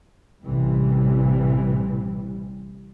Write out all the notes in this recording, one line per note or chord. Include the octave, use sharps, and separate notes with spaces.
A1 C3 E3 G3